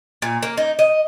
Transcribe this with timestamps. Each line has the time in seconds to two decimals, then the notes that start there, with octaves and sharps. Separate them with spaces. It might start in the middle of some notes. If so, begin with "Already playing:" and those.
0.22 A#2
0.43 A#3
0.57 D#4
0.79 D#5